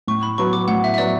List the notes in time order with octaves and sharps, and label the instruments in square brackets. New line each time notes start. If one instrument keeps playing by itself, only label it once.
[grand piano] A2 [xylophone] C#6
[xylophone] B5
[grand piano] F#3 B3 F#4 [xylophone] C#6
[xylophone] D6
[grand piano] A2 [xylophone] F#5
[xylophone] E5
E5
[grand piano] F#3 B3 F#4 [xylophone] D5